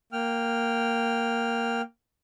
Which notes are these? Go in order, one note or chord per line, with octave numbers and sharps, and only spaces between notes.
A#3 G5 F6